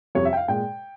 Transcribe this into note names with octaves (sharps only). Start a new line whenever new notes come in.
F2 C3 G3 C#5
E5
G5
F5
A#2 G#3 G5